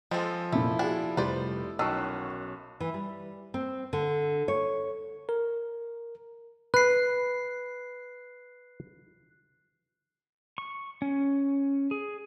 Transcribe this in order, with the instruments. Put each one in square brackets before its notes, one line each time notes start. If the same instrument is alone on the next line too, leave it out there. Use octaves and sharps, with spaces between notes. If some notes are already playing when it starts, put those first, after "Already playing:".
[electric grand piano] F3 [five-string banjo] G#3 C4 A4
[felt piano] F1 A#2 [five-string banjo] A3 [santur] E4
[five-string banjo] D4 F#5 G#5 [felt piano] F#4 G#4
[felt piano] F1 G3 [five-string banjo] B4 C5 D5
[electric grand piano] B1 D#6 C7 [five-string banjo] D#3 [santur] C#4 F#4 [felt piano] A5 E6
[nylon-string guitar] E3
G3
C4
D3
C#5
[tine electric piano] A#4
[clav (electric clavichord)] B4 [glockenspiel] F#6 C7
[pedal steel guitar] C#6
C#4
G#4